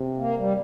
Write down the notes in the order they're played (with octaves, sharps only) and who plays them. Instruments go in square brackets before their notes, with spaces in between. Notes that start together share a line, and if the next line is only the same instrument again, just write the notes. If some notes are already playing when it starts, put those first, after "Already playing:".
Already playing: [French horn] C3
[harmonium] A#3
G3